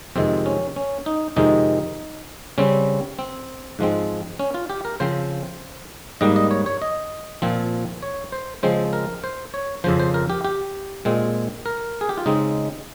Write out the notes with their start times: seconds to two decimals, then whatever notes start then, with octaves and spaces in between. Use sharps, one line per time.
0.16 F2 C3 D#3 G#3 C4
0.46 C#4
0.76 C#4
1.06 D#4
1.36 F2 C3 D#3 G#3 D#4
2.58 C#3 G3 C4 C#4
3.19 C4
3.79 G#2 F3 G#3 C4
4.39 C#4
4.54 F4
4.70 G4
4.85 A#4
5.00 C#3 F3 C4 C5
6.21 G#2 G3 A#3 D#5
6.36 D#5
6.51 C#5
6.66 C#5
6.82 D#5
7.42 A#2 F3 C4
8.03 C#5
8.32 C5
8.63 C#3 F3 G#3 C4 C5
8.93 A#4
9.24 C5
9.54 C#5
9.84 F2 C#3 F3 C5
9.99 C5
10.14 A#4
10.30 G4
10.45 G4
11.05 A#2 G#3 C4
11.66 A#4
12.01 G#4
12.09 G4
12.18 F4
12.26 C#3 G#3 C4 D#4